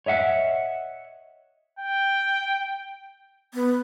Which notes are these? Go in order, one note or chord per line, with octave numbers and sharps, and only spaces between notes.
C#5 D#5 E5 F#5
G5
B3